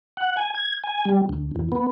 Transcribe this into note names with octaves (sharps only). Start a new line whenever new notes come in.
F#5
G#5
G#6
G#5
G3
D2
E2
B3